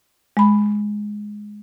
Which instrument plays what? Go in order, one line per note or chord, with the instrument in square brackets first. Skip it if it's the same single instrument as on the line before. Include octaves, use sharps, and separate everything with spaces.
[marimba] G#3 B5